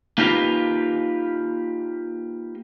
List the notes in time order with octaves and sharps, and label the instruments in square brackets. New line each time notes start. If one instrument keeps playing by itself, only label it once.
[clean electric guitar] A#3 D#4 F4 G4 B4